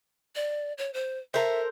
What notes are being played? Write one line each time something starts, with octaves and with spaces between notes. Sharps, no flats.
D5
C#5
C5
A4 A#4 C5 E5